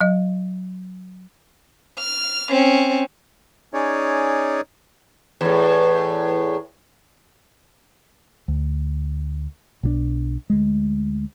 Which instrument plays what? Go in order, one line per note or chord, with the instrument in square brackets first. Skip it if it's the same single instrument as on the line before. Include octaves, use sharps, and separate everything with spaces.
[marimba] F#3 D#5
[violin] F6
C4 C#4
[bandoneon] C#4 D#4 G#4 C#5 D5
[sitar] E2 A2
[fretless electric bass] D2
B1 D#3 D4
D2 G#3